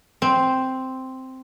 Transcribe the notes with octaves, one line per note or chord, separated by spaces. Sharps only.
C4